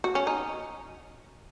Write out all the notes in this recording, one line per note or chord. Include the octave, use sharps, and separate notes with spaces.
F#4
C#4
D#4